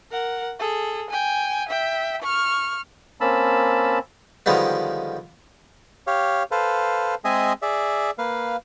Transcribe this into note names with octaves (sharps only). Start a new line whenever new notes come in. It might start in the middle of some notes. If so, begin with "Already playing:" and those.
A#4 F#5
G#4 A4
G5 G#5
E5 G5
C#6 F6
A#3 C4 C#4 A5 B5 E6
D3 D#3 F3 G3 G#3 B3
G4 C#5 F5
A4 B4 C5 F5
G#3 C4 G#4 D#5 E5 G#5
G#4 D5 E5
A#3 B4 F5